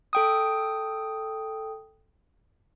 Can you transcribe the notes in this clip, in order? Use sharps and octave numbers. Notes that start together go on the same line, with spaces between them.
A4 G5 D#6